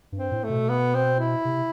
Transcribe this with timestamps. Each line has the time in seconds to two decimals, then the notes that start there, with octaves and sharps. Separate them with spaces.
0.12 G2
0.18 C4
0.31 A2
0.44 A3
0.50 B2
0.69 B3
0.95 C4
1.20 E4
1.45 C3